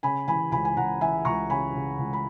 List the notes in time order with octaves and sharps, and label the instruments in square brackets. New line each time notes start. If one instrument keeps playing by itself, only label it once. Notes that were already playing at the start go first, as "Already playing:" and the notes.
[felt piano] C#3 G#5 B5
E3 G#5 B5
C#2 G#5 B5
G#5
C#2 F#5 A#5
E3 E5 G#5
C#2 A#5 C#6
C#3 G#5 B5
C#3
C#2
B5